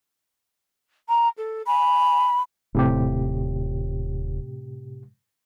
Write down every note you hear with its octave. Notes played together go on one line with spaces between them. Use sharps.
A#5
A4
G#5 B5
D#1 A2 C3 G4